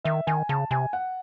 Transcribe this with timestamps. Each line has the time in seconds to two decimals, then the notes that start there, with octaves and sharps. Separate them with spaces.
0.04 D#3 E5
0.27 D#3 G#5
0.49 C#3 A5
0.71 C3 G#5
0.93 F#5